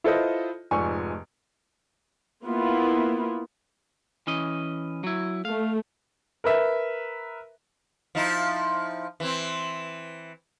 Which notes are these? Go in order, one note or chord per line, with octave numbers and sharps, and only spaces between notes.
E4 F4 A4 B4 C5 D#5
F1 G#2 F3 D5 G#5 C#6
A#3 B3 E4 F4
E3 C#4 D#5
F#3 E4
A3 F5
A#4 B4 E5
F3 D#4 E4
E3 C4